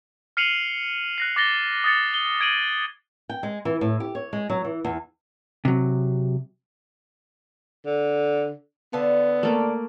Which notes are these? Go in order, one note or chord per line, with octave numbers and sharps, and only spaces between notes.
F6 C7 C#7 D#7 F7 F#7
F#6 A#6 C7
D6 A6 A#6 G7
D#6 A6 C#7
G7
G#6 D7 D#7 F#7
G5
G#3
E3
A2
G4
C#5
G#3
F#3
E3
E2
C3 F#3
D3
D3 B3 F5 A5
A3 A#3 D6